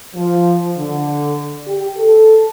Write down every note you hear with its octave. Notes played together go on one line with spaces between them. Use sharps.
F3
D3
G4
A4